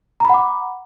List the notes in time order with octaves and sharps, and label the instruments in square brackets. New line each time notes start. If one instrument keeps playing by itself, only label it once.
[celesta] A#5
B5
F#5
D6